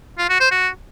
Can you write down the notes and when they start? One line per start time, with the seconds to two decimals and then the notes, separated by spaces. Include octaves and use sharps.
0.18 F4
0.29 F#4
0.40 C5
0.51 F#4